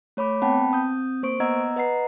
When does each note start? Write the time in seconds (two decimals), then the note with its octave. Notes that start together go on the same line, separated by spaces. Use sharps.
0.17 A3 C#5 B5 D6
0.42 B3 C4 F#5 G5 A5 B5
0.72 C4 D#6 G6
1.23 A#3 C5 C#6 D7
1.40 B3 D#5 F#5 A#5 E6 G#6
1.76 B4 D#5 F#5 A#5 C7